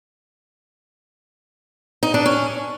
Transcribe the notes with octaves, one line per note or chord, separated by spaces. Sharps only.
D#4
D4
C#4